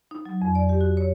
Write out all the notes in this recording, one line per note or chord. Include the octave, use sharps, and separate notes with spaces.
D#4
F#3
F2
D5
G4
F#4
C#5